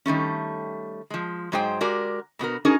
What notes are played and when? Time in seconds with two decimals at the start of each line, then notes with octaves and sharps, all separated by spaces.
0.06 D#3 G3 A3 C#4
1.10 F3 G#3
1.52 G#2 F#3 G#3 G#4 C5 G5
1.81 G#3 F#4 G4 A#4 D5
2.39 B2 B3 F#4 A#4
2.65 C#4 D#4 F#4 G#4 A#4